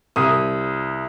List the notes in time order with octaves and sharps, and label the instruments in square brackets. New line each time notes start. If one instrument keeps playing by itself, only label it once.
[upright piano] C2 D#6